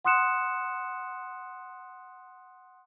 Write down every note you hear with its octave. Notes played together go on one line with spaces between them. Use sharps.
F#5 C6 D#6 F#6 C#7 E7